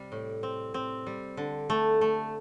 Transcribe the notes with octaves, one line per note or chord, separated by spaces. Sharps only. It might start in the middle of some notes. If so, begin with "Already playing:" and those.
Already playing: C3 G3
A2
C4
C4
G3
D3
A3
A3